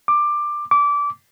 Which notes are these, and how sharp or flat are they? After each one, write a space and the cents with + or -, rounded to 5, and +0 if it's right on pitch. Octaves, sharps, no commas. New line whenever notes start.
D6 +15
D6 -20